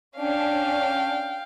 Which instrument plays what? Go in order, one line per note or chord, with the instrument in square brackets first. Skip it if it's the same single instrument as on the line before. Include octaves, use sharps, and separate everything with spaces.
[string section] C#4 D4 [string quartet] F5 G5